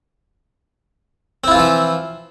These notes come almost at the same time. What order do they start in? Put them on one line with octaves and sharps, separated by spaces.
C4 E4 F4 E3 F3